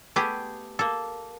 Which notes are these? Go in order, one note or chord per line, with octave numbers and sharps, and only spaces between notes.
A3 B3 G4 G#4
A#3 A4